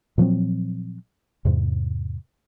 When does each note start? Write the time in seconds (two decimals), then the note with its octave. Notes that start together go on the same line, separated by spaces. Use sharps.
0.18 A#2 F3 F#3 C4
1.45 E2 G#2 C3